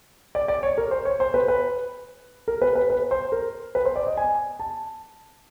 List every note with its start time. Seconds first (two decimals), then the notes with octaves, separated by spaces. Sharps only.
0.35 D5
0.48 D5
0.63 C#5
0.78 A#4
0.91 C5
1.05 C#5
1.20 C5
1.34 B4
1.48 B4
2.48 A#4
2.62 B4
2.75 B4
2.90 B4
3.11 C5
3.32 A#4
3.75 B4
3.85 C5
3.96 D5
4.07 D#5
4.17 G#5
4.60 A5